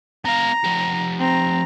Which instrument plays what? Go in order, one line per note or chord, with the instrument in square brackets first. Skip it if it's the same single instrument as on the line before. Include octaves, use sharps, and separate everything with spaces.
[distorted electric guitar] B3 F5 [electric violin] A#5
[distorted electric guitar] F3 G4
[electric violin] C4 A#5